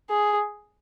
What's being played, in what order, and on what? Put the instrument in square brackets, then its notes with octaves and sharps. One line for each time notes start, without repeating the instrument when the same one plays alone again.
[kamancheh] G#4